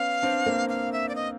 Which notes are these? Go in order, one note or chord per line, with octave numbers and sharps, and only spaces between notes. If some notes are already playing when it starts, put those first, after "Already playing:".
Already playing: B3 C#4 F5
C4 D4
A#3 C4
F5
E5
D5
D#5